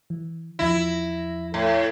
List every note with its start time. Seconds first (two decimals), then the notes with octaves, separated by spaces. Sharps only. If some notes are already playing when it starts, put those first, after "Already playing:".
0.10 E3
0.59 E2 F3 E4 A#6
1.54 A2